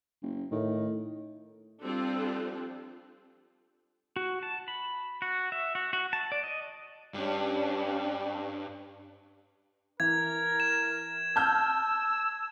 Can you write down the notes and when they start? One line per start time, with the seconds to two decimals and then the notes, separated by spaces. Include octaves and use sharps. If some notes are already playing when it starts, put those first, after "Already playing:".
0.22 F#1
0.52 A2 D#3
1.83 F3 G3 C4 D4 F4 A4
4.16 F#4
4.43 A5
4.68 B5
5.22 F#4
5.52 E5
5.75 F#4
5.93 F#4
6.13 A5
6.32 D5
6.43 D#5
7.14 G2 C#4 D4 G4
10.00 E3 A#4 G#6
10.60 E7
11.36 A5 E6 F6 G6